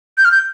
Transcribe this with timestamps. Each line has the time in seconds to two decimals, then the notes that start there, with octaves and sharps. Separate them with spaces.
0.18 G6
0.25 F6
0.32 G6